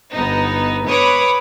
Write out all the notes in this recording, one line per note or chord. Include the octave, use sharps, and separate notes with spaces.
G1 B3 D#4
B4 C#5 B5 D6 D#6